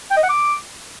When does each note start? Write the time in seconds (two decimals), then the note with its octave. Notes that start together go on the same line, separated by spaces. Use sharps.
0.10 G5
0.17 D#5
0.23 F#5
0.29 D6